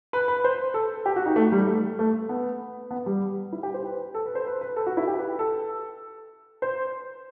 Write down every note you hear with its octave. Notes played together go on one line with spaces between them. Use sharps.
B4
B4
C5
A4
G4
F#4
D#4
A3
G3
A3
A3
B3
B3
G3
E4
G4
C5
B4
A4
B4
C5
B4
B4
A4
F#4
E4
G4
B4
A4
C5